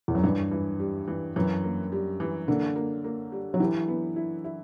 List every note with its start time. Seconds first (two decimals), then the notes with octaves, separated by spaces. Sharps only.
0.08 E2
0.15 F#2
0.23 G2 E3
0.51 E3
0.79 G3
1.07 E3
1.36 F#2 E3
1.64 A#3
1.92 G3
2.20 E3
2.48 D3 A#3
2.76 A#3
3.04 A#3
3.32 G3
3.54 F#3
3.60 E3 G4
3.88 B3
4.16 E4
4.44 E4